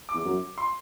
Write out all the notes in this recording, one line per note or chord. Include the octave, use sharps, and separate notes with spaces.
D6
E2
F#2
C6